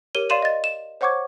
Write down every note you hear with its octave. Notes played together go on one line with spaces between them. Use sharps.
G4 A#4 C#5 D#7 G7
D5 F5 C6 D#7 E7 F#7
D#5 A6
E7
C5 C#5 F#5 C#6 D6 G#6